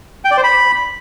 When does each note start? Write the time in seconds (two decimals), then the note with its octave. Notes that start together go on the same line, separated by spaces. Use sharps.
0.25 G5
0.31 D5
0.37 C5
0.44 B5